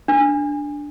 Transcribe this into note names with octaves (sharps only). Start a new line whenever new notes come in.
D4